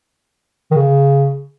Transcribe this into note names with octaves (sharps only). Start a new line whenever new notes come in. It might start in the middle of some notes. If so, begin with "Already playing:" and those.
D#3
C#3